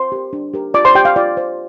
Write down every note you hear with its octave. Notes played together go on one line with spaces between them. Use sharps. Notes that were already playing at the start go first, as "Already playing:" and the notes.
Already playing: C5 C6
G4 A#4
D4
G4 A#4
F4 D5 D6
C5 C6
G4 C5 G5
F5
F4 D5
C5